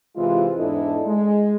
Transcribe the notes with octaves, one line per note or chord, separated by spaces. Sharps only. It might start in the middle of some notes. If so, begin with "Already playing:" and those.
C3 E3 G#3 E4 F4
E2 G#2 D4 E4 A4 D#5
G#3